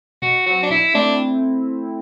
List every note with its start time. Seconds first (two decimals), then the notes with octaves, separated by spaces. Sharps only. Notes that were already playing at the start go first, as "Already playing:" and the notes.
0.22 B2 F#4
0.46 F#3 C4 F#4
0.63 D4
0.70 B2 E4
0.94 A3 C4 D4 E4